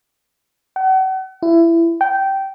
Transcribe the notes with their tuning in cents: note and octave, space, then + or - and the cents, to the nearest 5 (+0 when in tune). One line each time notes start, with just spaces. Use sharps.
F#5 +40
E4 +20
G5 -15